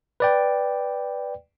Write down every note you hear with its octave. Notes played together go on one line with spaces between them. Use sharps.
B4 D5 G5